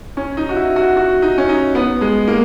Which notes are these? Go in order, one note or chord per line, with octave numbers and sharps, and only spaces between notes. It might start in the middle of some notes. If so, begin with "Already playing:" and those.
C#4
D#4
F#4
E4
F#4
F#4
D#4
C#4
D#4
B3
G#3
A#3